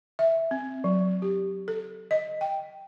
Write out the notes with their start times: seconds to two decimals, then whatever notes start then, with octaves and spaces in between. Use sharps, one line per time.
0.19 E5
0.51 C4
0.84 F#3
1.22 G4
1.68 A4
2.11 D#5
2.41 G5